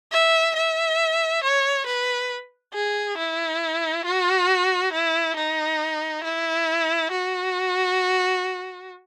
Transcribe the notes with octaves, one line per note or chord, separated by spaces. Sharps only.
E5
E5
C#5
B4
G#4
E4
F#4
E4
D#4
E4
F#4